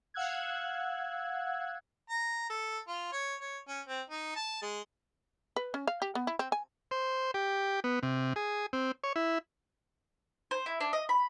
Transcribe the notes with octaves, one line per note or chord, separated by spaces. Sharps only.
F5 F#5 E6 F#6 G#6
A#5
A4
F4
C#5
C#5
C#4
C4
D#4
A5
G#3
B4
C#4
F5
G4
B3
E4
C4
G#5
C5
G4
B3
C3
G#4
C4
C#5
E4
C5
E4
D4
D#5
B5